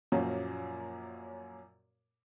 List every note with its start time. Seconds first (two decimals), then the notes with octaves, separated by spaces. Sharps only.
0.12 F#2 A#2 F3 F#3 A#3 C#4